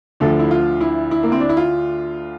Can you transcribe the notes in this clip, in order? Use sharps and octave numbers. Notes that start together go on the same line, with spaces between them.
D2 D3 F3 A4
E4
F4
E4
E4
A#3
C4
D4
E4
F4